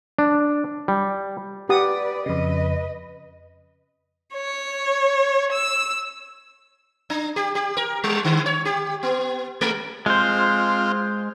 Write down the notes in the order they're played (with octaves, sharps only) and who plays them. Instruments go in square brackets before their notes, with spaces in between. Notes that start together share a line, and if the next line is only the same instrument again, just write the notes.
[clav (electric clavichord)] D4
G3
[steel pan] G4 F#5 D#6 [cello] B4 D5
[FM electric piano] F2 C#3 [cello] B4 D#5
[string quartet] C#5
E6
[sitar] D4
G4
G4
A#4
G3
D3
C#5
G4
B3
G#3
[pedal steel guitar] G#3 C5 [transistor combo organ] C4 F4